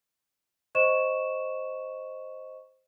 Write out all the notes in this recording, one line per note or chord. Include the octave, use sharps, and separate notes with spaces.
C5 D#5 C#6 E7